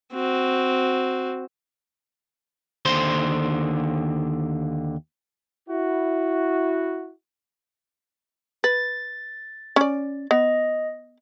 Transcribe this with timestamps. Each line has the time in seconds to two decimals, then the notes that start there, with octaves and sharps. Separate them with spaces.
0.13 C4 F#4
2.85 D#2 D3 C5 C6
5.69 E4 F#4
8.64 B4 A6
9.76 C#4 D5
10.31 B3 D#5